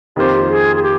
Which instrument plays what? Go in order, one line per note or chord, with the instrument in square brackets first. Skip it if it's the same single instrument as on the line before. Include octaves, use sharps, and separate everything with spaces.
[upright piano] F2 D#3 A#3 F4 C5 [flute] G4
[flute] G#4
G#4
G4